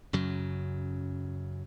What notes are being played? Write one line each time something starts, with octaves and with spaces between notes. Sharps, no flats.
F#2 C#3 F#3